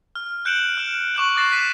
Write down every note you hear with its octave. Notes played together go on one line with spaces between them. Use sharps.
F6
F#6 G6 C#7 D7 E7 F#7
F6 E7
C#6 D6 F#6 F#7
C#6 D6 F#6 A6 A#6 C7
F#6 A6 B6 D#7 E7